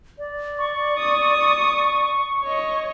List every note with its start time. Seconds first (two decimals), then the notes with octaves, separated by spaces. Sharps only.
0.19 D5
0.59 C#6
0.99 D#6
2.44 C#5 D#5